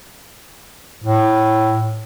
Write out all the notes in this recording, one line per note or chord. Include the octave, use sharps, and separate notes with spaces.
A2